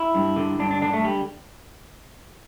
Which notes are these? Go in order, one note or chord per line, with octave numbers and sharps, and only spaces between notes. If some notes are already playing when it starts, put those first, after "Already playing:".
Already playing: E4
G2
D3
G2 D4
D4
D3 D4
A3
G3